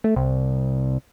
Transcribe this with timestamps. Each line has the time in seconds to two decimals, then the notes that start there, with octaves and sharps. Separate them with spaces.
0.04 A3
0.16 C2